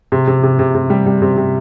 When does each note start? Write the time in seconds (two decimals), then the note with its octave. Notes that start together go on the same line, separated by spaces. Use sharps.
0.12 C3
0.27 C3
0.43 C3
0.59 C3
0.75 C3
0.90 G3
1.06 G3
1.22 C3
1.37 C3